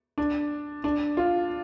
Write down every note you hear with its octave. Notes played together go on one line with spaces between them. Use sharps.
D4
D4
F4